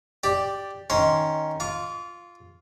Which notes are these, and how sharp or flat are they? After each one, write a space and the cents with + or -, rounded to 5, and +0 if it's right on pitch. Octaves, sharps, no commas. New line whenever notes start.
G4 +0 D5 +0
D#3 +0 C#4 +0 C6 +0
F4 +0 D6 -45